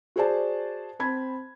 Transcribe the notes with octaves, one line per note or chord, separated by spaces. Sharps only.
F#4 G#4 C5 D5 A5
C4 A5 B5 G#6